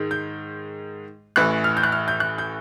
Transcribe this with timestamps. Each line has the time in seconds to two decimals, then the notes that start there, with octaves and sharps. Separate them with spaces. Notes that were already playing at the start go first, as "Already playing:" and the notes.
Already playing: G#2 D#3 G#3
0.11 G6
1.36 A1 A2 E3 F#6
1.64 F6
1.77 G6
1.84 F#6
1.92 F6
2.08 G6
2.20 F#6
2.38 G6